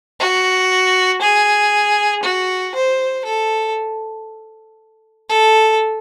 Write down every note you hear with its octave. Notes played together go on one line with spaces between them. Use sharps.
F#4
G#4
F#4
C5
A4
A4